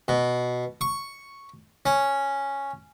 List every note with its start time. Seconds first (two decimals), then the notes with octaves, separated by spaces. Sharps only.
0.08 B2
0.81 C#6
1.86 C#4